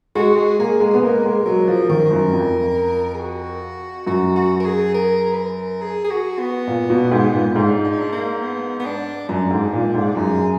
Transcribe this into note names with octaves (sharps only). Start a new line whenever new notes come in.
G#3 F#4
G#4
A#3 G#4
G#3
B3 G#4
A#3 A#4
G#3
F#3 A#4
F3
D#3 A#4
F#2
F2
G#4
F#4
F#2 F#4
F#4
A#4
G#4
A#4
B4
A#4
G#4
G#4
F#4
B3
A#2
B2
G#2
A#2
G#2 D4
D4
D#4
D4
A#3
B3
B3
D4
F#2 D4
G#2
A#2
G#2
F#2 G#4